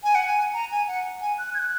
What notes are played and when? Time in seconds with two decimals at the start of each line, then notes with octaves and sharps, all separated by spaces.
0.04 G#5
0.15 F#5
0.27 G#5
0.54 A#5
0.71 G#5
0.88 F#5
1.21 G#5
1.38 F#6
1.54 G#6
1.59 F#6